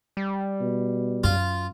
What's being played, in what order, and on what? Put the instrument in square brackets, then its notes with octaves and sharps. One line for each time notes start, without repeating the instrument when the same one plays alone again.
[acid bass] G3
[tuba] B2
[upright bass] F#2 [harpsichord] F4